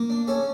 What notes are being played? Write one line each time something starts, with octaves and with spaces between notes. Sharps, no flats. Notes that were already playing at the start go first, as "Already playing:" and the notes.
Already playing: A#3
D4
C#4 A4